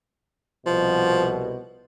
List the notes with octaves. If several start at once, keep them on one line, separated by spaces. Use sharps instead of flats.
C2 B2 F3